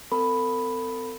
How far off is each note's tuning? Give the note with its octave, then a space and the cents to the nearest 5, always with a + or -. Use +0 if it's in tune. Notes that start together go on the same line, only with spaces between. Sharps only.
C4 -45 A4 +40 B5 +0